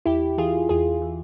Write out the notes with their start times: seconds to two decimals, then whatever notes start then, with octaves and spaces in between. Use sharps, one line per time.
0.06 E2 E4 G4
0.38 E3 F4 G#4
0.69 E2 F4 G#4
1.02 E3